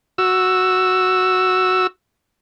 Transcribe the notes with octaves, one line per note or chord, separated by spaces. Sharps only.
F#4 E6